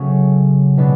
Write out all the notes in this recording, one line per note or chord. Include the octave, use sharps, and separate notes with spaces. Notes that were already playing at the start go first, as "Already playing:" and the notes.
Already playing: C#3 F#3 A3 C#4
B2 G#3 B3 D4